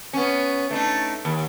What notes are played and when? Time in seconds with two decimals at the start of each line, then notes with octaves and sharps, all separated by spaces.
0.13 B3 C#4
0.71 A3 D4 D#4
1.25 D#2